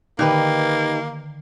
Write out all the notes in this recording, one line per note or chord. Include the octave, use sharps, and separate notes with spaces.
D3 D#3 A#3 D#4 G4 B4 D6